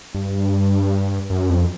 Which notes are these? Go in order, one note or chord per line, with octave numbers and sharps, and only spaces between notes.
G2
F#2
F2